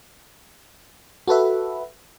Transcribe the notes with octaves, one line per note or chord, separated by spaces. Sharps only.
F#4 A4 B4 E5